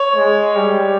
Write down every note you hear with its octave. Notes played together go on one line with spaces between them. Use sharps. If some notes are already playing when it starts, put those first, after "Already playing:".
Already playing: C#5
G#3
G3